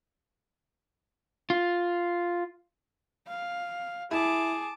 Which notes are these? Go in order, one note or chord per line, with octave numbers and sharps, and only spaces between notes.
F4
F5
E4 G#4 A5 D6